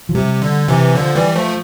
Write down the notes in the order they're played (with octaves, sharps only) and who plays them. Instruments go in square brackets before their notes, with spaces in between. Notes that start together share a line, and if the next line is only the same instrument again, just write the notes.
[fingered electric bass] F3
[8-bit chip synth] C3 [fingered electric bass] G3
[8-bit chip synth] D3
C3 E3
D3 F3
E3 G3
F3 A3